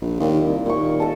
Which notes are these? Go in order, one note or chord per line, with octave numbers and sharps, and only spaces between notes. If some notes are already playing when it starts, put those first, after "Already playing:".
A#1
D#2 A#2 F4
C2
D#2 A#2 C#6
A4 D#5 A5